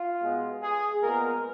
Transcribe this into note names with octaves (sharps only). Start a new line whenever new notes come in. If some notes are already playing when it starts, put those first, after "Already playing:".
Already playing: F4
B2 G#3 B3
G#4
A#2 G#3 B3 A#4